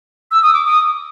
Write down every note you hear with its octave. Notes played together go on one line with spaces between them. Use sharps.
E6
D#6
D6
D#6